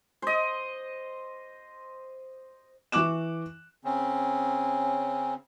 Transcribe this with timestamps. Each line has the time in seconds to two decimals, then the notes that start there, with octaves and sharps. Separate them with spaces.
0.22 C5 D#5
2.92 E3 C#6 D6 F#6 E7
3.84 C#3 C4 C#4